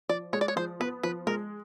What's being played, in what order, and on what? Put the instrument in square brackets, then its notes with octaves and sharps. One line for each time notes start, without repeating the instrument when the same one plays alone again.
[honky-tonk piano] F3 [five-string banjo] D5
[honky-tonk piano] G#3 [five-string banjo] C#5
[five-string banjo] D5
C#5
[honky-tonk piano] F3 [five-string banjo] C5
[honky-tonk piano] B3 [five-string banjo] B4
[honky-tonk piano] F3 [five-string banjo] B4
[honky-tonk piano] G#3 [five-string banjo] A#4